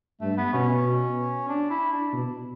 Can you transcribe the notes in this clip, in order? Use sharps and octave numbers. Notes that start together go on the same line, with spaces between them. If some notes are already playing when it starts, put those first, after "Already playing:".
G2 A3
B3
B2 C#4
C#4
D4
E4
D4
B2